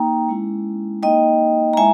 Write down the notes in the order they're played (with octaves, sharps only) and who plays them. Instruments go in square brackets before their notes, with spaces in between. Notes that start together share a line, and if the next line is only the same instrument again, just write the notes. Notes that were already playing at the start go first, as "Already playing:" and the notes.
Already playing: [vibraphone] A#3 D#4 G5 A#5
G#3 C#4 E4
A#3 D#4 D#5 G5
A#5
G#3 E4 E5 G#5